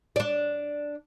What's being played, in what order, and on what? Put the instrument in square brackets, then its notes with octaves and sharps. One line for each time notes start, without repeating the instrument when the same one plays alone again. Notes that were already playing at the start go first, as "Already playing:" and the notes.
[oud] D4 D5